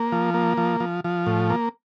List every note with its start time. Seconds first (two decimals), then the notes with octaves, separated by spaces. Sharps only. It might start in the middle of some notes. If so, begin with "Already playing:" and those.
Already playing: A#3
0.12 F3
0.34 A#3
0.57 F3
0.80 F3
1.04 F3
1.27 A2
1.50 A#3